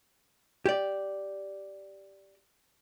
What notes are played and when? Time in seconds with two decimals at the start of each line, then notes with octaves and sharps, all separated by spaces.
0.66 G4 D5